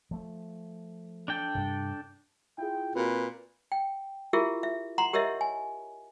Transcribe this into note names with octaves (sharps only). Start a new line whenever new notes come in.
F3 A3
D4 A4 G5
G2 C3
E4 F4 G#4 G5
A#2 C4 F#4 B4
G5
E4 F4 G4 G#4 A#4 E5
E5
F#5 A#5 C6
G4 A#4 C#5 D#5 E5
G#5